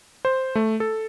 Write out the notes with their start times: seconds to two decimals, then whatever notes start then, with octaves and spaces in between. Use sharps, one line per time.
0.25 C5
0.55 A3
0.80 A4